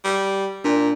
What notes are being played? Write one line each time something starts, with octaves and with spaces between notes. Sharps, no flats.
G3
A#2 D4